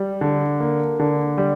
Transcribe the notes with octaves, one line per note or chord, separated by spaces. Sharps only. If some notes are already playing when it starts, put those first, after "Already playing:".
Already playing: G3
D3
A#3
D3
G3